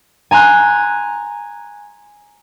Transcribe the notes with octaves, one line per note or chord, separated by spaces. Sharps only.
G#5 A#5 C6 F#6